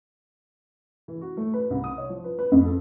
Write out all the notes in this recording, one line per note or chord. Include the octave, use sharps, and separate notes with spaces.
E3
F#4
A3
B4
C2
D#6
C#5
F3
B4
B4
F2
A4